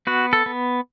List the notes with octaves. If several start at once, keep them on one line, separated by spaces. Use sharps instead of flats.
B3 F#4
A4
B3